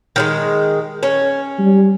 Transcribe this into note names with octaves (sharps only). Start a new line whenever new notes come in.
D#3 F#3 G#3
C#4
G3